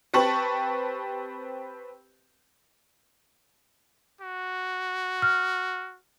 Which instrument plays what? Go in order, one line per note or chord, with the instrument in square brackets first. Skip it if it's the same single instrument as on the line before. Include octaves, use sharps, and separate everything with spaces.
[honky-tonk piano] C4 G4 B4 A5 C#6 F#7
[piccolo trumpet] F#4
[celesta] F6